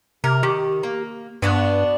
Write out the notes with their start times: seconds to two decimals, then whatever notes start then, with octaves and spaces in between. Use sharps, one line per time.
0.24 C3 A#4
0.43 D#3 G4
0.83 A#3
1.42 G2 B3 D4 F#4